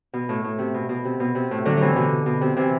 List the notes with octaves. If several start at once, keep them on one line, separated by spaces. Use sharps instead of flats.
B2
A2
A2
C3
B2
B2
C3
B2
C3
A2
D3 F#3
C3 E3 F#3
B2 D3
B2
C3
C3 E3